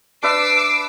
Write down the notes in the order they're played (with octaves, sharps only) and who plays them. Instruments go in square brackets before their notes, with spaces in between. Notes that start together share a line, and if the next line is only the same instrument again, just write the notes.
[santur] D4 B4 E5 [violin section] D6 E6 C7